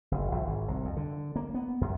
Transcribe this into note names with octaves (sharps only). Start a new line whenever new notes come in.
F#1
A#1
G#1
C2
F2
D3
A#3
B3
F#2